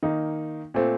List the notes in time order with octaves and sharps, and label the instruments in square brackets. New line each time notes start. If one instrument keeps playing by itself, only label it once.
[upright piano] D#3 A#3 D#4
A#2 A3 C4